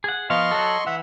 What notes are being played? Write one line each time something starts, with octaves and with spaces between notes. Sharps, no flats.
G#4 F#5
F3 B3 D#5 F5 C6 C#6
F#3 F#4 A4
E3 E5 F#5